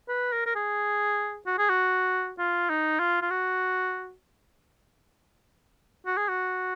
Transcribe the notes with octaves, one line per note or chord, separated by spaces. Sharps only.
B4
A#4
A#4
G#4
F#4
G#4
F#4
F4
D#4
F4
F4
F#4
F#4
G#4
F#4